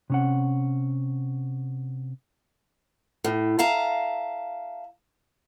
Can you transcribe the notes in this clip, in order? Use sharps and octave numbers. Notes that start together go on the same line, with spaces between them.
C3 C#4 F#5
A2
E5 F5 A5 A#5